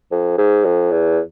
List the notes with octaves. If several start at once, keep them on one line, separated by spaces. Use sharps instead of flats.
F2
G#2
F2
E2